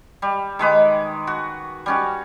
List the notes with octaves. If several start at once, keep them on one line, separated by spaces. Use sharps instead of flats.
G3
D#3 G#3 B4 D6
F#4
G3 C#4 F#4